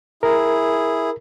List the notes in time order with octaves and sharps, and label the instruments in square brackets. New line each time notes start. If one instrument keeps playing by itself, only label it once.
[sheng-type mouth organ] E4 G#4 [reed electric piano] A#4